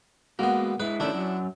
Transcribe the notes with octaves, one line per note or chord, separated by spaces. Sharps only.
G#3 A#3 B3 F#4
G#3 E4 B4
D#3 A3 C#4 D4 E4
F#2 F#3